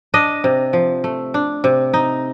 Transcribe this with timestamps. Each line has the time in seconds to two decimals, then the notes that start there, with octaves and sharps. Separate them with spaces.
0.14 D4 D#5
0.44 C3
0.73 F3
1.04 A3
1.34 D4
1.64 C3
1.94 D#4